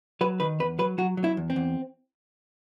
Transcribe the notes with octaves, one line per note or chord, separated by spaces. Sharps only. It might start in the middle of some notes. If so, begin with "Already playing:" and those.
F#3 B4
D#3 B4
E2 B4
F#3 B4
F#3 F#4
F#3
E4
E2
C4
E2